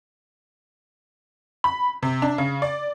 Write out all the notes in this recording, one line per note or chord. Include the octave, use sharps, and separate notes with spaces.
B5
C3
D4
C#3
D5